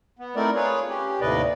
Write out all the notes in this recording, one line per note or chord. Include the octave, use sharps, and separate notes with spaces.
B3
A3 C4 D#4 E4 A#4 D5
F4 G#4 B4 C#5
C#4 G4
D#2 A2 C3 B4 D5 D#5